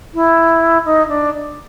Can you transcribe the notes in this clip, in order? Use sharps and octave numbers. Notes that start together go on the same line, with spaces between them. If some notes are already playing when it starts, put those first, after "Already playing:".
E4
D#4
D4